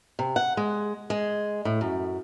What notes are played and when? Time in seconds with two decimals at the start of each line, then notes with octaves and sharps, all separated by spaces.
0.19 C3
0.36 F#5
0.57 G#3
1.10 G#3
1.65 A2
1.81 F#2